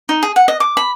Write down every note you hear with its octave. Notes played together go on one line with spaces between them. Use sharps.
D#4
G#4
F#5
D#5
D6
B5